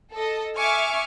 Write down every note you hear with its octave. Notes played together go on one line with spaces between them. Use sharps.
A4 D#5
E5 G#5 C#6 D6 F6